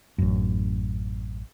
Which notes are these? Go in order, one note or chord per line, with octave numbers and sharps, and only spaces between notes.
A1 F#2